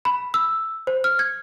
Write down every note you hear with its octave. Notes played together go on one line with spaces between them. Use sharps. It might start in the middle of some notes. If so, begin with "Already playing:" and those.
B5
E6
C5
F6
G#6